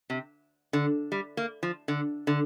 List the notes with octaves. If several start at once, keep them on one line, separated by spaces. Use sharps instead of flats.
C3
D3
G3
A#3
F3
D3
D3